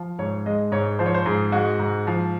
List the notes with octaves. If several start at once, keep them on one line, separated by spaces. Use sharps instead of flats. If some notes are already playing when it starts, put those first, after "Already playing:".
Already playing: F3
G#2 C#5
G#3 D#5
G#2 C#5
F3 C5
C#5
C5
G#2 G#4
G#3 F#4
G#2
F3